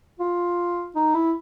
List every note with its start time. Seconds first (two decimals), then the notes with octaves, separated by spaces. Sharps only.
0.20 F4
0.96 D#4
1.14 E4